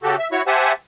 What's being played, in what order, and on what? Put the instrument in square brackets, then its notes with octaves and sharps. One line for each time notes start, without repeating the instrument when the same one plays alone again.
[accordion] C#3 F#4 G4 A4
E5
E4 F#4 C#5 C#6
G4 C5 E5 F#5 G#5 A5